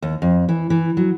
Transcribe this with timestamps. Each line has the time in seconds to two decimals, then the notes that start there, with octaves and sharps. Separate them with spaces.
0.02 D#2
0.22 F2
0.49 E3
0.70 E3
0.97 F#3